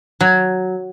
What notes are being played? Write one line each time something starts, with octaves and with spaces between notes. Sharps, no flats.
F#3